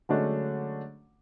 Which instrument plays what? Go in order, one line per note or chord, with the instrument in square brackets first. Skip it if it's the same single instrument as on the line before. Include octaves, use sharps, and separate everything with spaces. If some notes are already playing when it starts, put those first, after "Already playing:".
[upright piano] D3 F#3 G#3 A3 C#4 D4